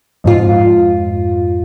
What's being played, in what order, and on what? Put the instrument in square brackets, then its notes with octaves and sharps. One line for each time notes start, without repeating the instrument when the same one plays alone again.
[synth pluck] F2 G#2 F4